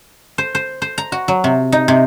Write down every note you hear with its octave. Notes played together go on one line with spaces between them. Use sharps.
C5
C5
C5
A#5
F#4
F#3
C3
D#4
C3